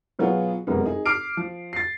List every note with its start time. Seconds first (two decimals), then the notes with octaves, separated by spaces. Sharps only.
0.19 B2 F#3 B3 F4 G#4
0.67 F1 F#2 B2 G#3 B3
0.85 D#4 G#4
1.06 D6 F6 C7 D7
1.37 F3
1.73 A6 C7